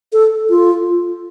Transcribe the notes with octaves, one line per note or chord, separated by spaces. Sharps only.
A4
F4